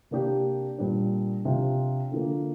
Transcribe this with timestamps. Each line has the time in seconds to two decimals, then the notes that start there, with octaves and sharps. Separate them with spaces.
0.11 C3 A#3 D4 G4
0.78 A#2 G3 D4
1.45 C3 F3 D4 F4
2.12 D3 F3 A#3